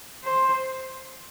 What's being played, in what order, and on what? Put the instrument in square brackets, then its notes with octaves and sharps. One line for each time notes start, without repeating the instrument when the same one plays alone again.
[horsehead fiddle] C5